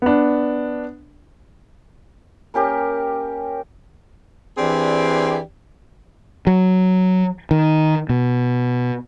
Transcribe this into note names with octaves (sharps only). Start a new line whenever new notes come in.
B3 D4
A#3 C#4 G4 A#4
E3 C4 D4 G4 G#4 D5
F#3
D#3
B2